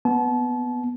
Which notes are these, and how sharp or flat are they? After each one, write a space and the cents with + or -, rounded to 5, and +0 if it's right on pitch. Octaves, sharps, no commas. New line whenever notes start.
B3 +0 A5 -30